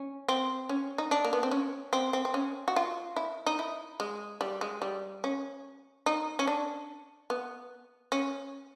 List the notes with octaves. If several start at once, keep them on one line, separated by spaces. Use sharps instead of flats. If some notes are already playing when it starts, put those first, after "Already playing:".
Already playing: C#4
C4
C#4
D#4
D4
A#3
B3
C4
C#4
C4
C4
C4
C#4
F#4
F4
E4
D#4
E4
G#3
G3
G#3
G3
C#4
D#4
C#4
D4
B3
C#4